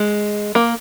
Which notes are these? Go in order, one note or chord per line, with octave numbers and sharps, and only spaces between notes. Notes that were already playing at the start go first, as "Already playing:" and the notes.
Already playing: G#3
A#3